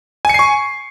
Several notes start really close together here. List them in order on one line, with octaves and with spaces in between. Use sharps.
G#5 C#7 C7 C#6